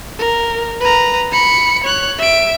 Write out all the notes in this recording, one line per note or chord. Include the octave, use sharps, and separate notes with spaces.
A#4
B4 A#5
B5 C#7
C#5 F#6
E5 D7